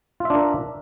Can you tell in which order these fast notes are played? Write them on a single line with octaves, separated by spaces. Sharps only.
F4 E5 D4 A#4